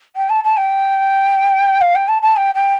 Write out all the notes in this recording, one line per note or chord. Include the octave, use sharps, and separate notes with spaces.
G5
A5
A5
G5
F5
G5
A5
A5
G5
G5